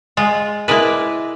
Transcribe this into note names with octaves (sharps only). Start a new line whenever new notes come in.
G#3 F4
G#3 E4 A#4 B4 D5